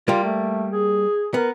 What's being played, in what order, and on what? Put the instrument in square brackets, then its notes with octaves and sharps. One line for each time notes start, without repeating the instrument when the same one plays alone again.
[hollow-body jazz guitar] G3 A#3 [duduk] F4
[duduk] A3
G#4
[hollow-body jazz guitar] B3 [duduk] A#4